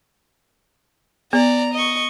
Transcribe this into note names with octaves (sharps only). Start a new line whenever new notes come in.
B3 D5 A#5
D#5 C#6